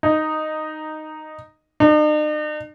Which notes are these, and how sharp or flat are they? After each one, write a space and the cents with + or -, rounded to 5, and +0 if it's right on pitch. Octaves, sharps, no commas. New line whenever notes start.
D#4 -5
D#4 -45